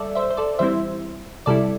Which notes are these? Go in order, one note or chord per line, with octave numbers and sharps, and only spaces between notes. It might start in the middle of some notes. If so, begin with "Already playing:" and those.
Already playing: G3 A4 D5 E5
C5 E5
C5
A4 D5
E3 G3 C4 E4 C5 E5
C3 G3 E4 A4 D5